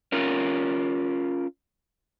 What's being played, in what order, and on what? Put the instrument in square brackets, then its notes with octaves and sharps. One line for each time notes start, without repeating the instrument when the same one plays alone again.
[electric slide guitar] C#4 F4 A#4